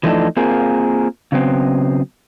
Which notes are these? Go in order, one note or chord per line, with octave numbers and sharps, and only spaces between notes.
E3 F3 A3 D4 D#4 A4
A#3 C4 F4 G#4 A#4
C#3 F#3 B3 C4